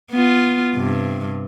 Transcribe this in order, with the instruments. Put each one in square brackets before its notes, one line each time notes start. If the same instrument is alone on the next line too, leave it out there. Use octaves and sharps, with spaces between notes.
[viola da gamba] B3 F4
G2 C3